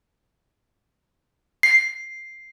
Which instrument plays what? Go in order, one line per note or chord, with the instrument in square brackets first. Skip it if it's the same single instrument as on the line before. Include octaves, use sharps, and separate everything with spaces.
[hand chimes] C7